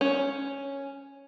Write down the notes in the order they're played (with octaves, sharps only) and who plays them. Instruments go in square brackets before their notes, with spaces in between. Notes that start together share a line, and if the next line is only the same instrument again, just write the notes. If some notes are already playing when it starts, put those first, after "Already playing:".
[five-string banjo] C#4